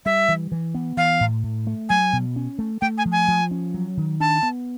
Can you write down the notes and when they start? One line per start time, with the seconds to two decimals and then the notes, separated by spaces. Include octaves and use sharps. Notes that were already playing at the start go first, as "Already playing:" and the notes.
0.05 G3 E5
0.29 E3
0.52 E3
0.75 B3
0.97 E3 F5
1.20 A2
1.43 A2
1.67 A3
1.89 F#3 G#5
2.13 B2
2.36 C#4
2.59 A3
2.81 A3 G5
2.98 G#5
3.05 F3
3.12 G#5
3.28 F3
3.51 C#4
3.74 F#3
3.97 D#3
4.20 D4 A5
4.43 B3